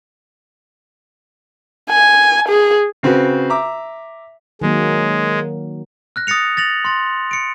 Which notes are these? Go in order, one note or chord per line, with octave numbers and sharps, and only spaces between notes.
G#5
G#4
C#3 C4 F#4 B4
E5 A#5 D6
D#3 F#3 G#3 A#3
F6 F#6 A#6
D#6 A6 A#6 C#7 F7
A6 A#6 F7 F#7
C6 A6
C#7 D7